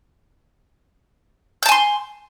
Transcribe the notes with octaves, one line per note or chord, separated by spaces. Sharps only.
G#5 A5 C6 G6